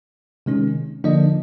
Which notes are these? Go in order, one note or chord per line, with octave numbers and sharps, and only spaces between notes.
C3 D#3 G#3 C#4
D3 F3 A#3 D4 D#5